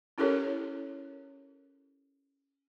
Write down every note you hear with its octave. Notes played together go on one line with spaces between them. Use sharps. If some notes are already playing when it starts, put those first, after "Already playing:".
C#4 E4 G4 A4 A#4 C#5